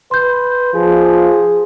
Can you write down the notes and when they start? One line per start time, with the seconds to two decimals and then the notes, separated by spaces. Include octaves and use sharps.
0.11 B4 C6 G6
0.75 F3 G#4